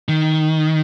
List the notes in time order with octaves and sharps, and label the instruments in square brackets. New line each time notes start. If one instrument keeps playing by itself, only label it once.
[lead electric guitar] D#3